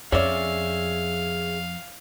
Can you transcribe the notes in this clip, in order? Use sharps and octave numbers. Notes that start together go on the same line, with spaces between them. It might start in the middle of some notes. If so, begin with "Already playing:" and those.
F2 C#4 G#4 C#5 D5 E5 F5